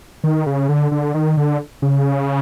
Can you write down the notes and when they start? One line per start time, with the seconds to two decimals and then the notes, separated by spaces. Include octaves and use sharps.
0.24 D#3
0.46 C#3
0.69 D3
0.92 D3
1.14 D#3
1.37 D3
1.82 C#3